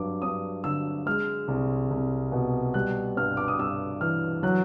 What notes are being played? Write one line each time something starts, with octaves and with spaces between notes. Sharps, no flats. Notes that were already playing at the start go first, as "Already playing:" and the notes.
Already playing: G2 F#3 D6
G2 D#6
D3 E6
G#3 F6
C2
C2
B2
G3 F#6
G2 F6
D6
D#6
G2 E6
E3 F6
F#3 F#6